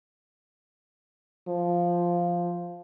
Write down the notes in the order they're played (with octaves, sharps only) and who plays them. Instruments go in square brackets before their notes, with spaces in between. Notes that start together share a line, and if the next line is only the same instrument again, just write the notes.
[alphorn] F3